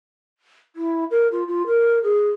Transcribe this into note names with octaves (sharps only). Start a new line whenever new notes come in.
E4
A#4
F4
F4
A#4
G#4